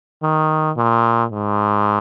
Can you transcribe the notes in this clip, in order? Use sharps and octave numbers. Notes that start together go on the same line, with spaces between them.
D#3
A#2
G#2